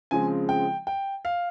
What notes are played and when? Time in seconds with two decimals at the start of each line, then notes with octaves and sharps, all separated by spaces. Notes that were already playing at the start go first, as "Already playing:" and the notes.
0.11 C#3 F3 G#3 C4 G#5
0.49 G5
0.87 G5
1.25 F5